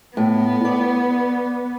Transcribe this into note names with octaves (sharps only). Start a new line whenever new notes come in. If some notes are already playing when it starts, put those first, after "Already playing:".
A2 B3
D5